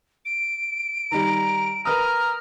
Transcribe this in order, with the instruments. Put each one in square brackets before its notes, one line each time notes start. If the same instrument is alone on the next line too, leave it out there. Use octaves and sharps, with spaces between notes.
[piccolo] D7
[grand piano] D#3 G3 [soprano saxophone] A#5
[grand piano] A#4 B4 D#6 [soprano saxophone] A#5 [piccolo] F6